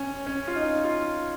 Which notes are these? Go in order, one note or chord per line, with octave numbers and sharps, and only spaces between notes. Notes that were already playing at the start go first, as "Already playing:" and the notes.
Already playing: C#4
C#4
F4
D#4
F4